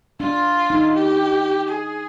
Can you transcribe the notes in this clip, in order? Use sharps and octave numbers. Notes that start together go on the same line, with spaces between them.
D4 F4
D#4
G4
G#4